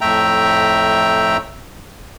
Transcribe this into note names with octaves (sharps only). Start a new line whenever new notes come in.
F2 A2 A3 E5 G5 A#5